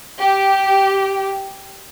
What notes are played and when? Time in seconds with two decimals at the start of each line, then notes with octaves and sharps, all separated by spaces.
0.20 G4